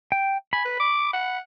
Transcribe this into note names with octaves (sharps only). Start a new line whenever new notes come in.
G5
G#5 B5
B4
D6
F#5